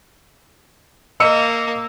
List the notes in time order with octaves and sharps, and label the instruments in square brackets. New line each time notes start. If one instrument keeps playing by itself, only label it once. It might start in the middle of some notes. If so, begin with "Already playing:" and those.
[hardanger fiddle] A#3 [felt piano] D#5 E6 C#7